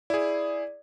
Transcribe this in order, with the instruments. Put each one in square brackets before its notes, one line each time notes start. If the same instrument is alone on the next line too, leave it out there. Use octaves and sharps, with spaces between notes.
[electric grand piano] E4 G#4 [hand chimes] D5